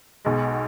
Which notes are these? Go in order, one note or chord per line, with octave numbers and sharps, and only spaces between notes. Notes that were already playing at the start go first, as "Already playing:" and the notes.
B1 B2 G#3